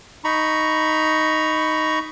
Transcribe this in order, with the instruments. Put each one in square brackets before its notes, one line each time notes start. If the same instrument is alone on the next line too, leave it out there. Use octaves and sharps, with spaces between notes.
[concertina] D#4 A#5 B5 C#6